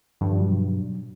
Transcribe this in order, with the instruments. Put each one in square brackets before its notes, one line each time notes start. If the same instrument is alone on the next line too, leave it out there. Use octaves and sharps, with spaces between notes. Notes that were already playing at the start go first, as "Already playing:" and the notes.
[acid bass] G2 [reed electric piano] D3 F3 G3
[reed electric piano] B2 F#3